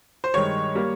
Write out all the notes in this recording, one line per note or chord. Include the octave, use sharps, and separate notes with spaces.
C5
G2 D#3 G#3 C#5
G3 A#3